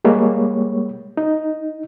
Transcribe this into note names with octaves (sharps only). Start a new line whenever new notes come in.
G3 G#3 A#3 C#5
D#4